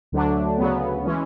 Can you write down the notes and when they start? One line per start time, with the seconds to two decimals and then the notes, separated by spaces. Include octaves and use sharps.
0.12 D2 D3 F#3 A3 D4
0.58 D2 C#3 F#3 B3
1.05 E3 G#3 C#4